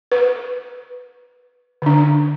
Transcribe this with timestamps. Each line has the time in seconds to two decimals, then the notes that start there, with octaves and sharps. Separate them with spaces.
0.12 B4
1.82 D3 D4